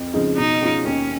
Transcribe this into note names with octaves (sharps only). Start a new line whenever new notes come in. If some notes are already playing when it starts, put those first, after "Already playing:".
Already playing: F2
C#3 F3 G#3 D#4
B2 D#4
G#3 C#4 F4
D#2 C#4